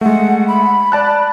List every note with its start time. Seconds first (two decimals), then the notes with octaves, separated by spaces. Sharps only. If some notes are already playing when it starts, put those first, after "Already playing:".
0.01 G#3 A3 F#5
0.48 B5
0.92 D5 A5 F#6